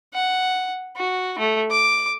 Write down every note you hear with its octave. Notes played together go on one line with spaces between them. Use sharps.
F#5
F#4
A3
D6